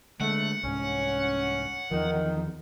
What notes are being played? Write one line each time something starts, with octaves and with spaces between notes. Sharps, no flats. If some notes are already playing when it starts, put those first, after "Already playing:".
D3 G#3 A3 F#5
C2 G#2 C#4
E2 D#3 F3